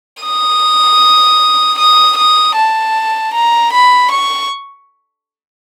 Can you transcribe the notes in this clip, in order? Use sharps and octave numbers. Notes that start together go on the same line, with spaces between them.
D#6
D#6
D#6
A5
A#5
B5
C#6